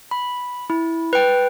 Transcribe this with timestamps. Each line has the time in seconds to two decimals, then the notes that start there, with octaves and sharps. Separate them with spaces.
0.11 B5
0.70 E4
1.13 B4 G5